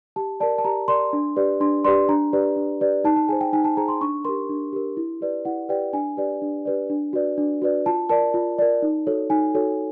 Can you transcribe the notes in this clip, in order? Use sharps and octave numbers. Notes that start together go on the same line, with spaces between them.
G4 A5
A#4 D5 A5
A5
G4 A#5
A#4 D5 C6
D4
G4 B4 D5
D4 C6
G4 B4 D5 C6
D4 A#5
G4 B4 D5
D4
G4 B4 D5
D#4 A5
A5
G#4 C5 G#5
G5
D#4 G#5
A5
G#4 C5 A#5
C6
D4 C#6
G4 A#4 C6
D4
G4 A#4
E4
G4 B4 D5
E4 F#5
G4 B4 D5 G5
D4 G#5
G4 B4 D5
D4
G4 B4 D5
D4
F#4 B4 D5
D4
F#4 B4 D5
F4 A5
A#4 D5 A5
F4
A#4 D5
D#4
F#4 A4 C#5
D#4 G#5
F#4 A4 C#5